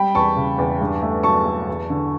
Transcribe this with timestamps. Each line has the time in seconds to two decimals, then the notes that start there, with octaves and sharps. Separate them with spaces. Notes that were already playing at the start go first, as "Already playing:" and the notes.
Already playing: G3 G5 B5
0.15 E2 A5 C#6
0.36 C#3
0.58 E2
0.81 G2
1.03 A3
1.23 F#3 A5 C#6
1.46 A3
1.68 E2
1.90 D3